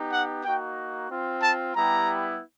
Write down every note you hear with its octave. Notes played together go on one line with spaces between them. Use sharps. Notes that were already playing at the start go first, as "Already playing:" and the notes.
Already playing: B3 D#4 G4
F#5
A#3 D#4 F#4 G5
C4 F4
A5
G3 B3 E4 G4 A#5